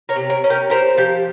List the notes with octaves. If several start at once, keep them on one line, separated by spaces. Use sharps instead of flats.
A#4 C#5
C3
A#4 C#5
C#4
G4 A#4
C4 G4 A#4
F3 G4